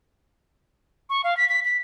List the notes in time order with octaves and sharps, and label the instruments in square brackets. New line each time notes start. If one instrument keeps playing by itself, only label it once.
[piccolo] C#6
F5
B6
B6
B6